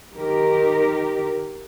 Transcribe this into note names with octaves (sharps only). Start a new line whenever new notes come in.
D#3 G4 A#4